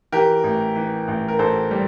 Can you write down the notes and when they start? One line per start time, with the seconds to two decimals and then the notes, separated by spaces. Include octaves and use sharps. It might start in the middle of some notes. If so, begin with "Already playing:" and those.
0.12 E3 G4 A#4
0.44 A1
0.76 E3
1.08 A1
1.28 A#4
1.39 A1 A4 C5
1.71 G3